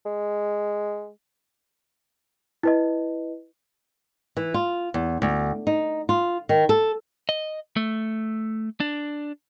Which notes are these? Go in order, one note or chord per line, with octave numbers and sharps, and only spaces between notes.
G#3
E4 B4 D#5
E3
F4
E2
D2
D#4
F4
D#3
A4
D#5
A3
D4